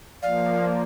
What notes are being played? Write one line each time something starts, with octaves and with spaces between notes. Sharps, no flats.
F3 A#3 D5 F5